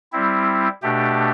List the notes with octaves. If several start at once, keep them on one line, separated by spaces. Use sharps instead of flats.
G3 C4 E4
B2 A3 D4 G4